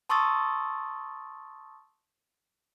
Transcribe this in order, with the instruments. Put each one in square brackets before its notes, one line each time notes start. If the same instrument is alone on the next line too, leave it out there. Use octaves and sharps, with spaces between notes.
[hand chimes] A5 C6 C#6 D#6 E6 A6